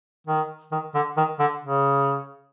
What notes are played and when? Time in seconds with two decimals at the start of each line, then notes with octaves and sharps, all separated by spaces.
0.27 D#3
0.72 D#3
0.94 D3
1.17 D#3
1.39 D3
1.62 C#3